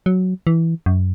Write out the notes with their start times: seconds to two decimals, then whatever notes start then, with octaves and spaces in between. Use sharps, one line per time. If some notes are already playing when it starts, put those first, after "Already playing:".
0.06 F#3
0.47 E3
0.86 F#2